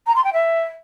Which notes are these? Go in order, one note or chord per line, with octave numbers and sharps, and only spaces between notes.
A#5
C6
G5
E5